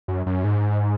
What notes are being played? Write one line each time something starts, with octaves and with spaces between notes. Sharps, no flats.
F#2
F#2
G#2